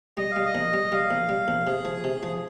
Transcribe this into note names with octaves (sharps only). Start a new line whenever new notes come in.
G3 D#5
G3 F5
D#5
A#1
G3
G3 F5
A#1
G3
A#1
C3 G#4
F3
C3
F3